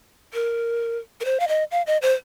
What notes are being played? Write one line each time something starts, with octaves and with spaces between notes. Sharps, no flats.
A#4
A#4
C5
F5
D#5
F5
D#5
C5